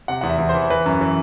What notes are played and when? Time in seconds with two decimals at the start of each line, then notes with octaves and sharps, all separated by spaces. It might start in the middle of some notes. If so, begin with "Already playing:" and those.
0.08 C3 F#5
0.21 E2 F#5
0.29 E5
0.39 E2
0.49 C5
0.54 E3
0.70 E3 B4
0.86 F#2
1.01 E3